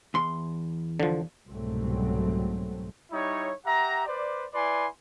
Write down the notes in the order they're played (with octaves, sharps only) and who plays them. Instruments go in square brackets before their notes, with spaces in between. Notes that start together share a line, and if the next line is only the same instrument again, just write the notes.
[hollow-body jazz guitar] E2 C6
[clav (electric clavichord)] D3 F3
[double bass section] C2 G#2 B2 F#3 A3 C4
[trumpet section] G3 D#4 E4 C#5
G4 E5 F#5 A#5
B4 C5 D5
E4 B4 D5 G#5 C6